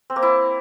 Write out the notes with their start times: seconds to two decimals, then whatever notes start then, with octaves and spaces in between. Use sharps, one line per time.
0.10 C4
0.16 A#3
0.22 E4